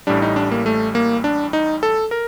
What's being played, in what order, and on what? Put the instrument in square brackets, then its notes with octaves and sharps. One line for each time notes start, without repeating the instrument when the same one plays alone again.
[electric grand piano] A1 A2 G3 D4
D#4
D4
A#3
A3
A#3
D4
D#4
A4
A#4